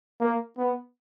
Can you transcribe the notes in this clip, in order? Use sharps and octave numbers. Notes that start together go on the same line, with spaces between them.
A#3
B3